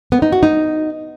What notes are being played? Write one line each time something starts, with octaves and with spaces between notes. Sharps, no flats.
B3
D#4
F#4
D#4